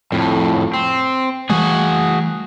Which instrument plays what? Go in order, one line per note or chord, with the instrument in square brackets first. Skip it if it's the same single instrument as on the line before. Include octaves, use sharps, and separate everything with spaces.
[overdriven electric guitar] F2 A2
C4
[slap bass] E3 G3 A3 [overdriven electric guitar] F#4 G#4